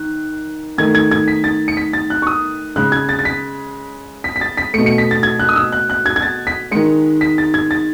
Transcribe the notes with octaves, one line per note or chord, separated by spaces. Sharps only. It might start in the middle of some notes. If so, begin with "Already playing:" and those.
Already playing: D#3 F#6
D#3 A3 G#6
G#6
G#6
B6
A6
C#7
B6
A6
F#6
C#6
D#6
C#3 G#3 F#6
G#6
A6
A6
B6
B6
B6
A6
B6
B2 A3 C#7
C#7
B6
A6
G#6
F#6
D#6
E6
F#6
F#6
G#6
G#6
A6
B6
D#3 G#3 C#7
B6
A6
G#6
A6